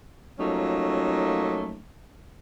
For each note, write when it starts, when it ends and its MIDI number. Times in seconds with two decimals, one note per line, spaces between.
0.39 1.80 53
0.39 1.80 54
0.39 1.80 57
0.39 1.80 58
0.39 1.80 61
0.39 1.80 63